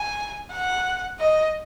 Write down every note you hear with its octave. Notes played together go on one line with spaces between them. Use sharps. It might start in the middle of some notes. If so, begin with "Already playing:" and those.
Already playing: G#5
F#5
D#5